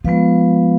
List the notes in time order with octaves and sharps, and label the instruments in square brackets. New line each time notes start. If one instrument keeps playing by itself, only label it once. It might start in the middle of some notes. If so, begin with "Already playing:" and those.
[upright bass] F3 [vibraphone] G#3 B3 F4 B4 F5